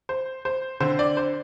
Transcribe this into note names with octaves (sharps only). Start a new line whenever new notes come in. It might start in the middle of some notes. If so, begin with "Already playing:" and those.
C5
C5
D3 C4 C5
D5
C5